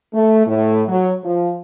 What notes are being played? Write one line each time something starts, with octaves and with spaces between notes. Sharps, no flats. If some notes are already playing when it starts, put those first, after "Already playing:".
A3
A2
F#3
F3